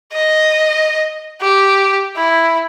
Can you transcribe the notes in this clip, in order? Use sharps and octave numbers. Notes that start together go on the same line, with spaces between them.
D#5
G4
E4